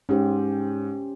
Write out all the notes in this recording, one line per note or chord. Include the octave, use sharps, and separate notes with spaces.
G#2 C#4 G4 C5